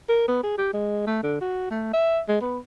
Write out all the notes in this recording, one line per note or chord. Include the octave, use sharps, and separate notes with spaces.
A#4
B3
G#4
G4
G#3
A3
D3
F#4
A3
E5
G#3
B3